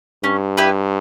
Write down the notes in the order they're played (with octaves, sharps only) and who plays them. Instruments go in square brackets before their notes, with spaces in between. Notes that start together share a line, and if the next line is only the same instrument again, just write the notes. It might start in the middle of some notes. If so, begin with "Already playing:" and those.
[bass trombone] G2 [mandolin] C#4
[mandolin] E4 G4 B4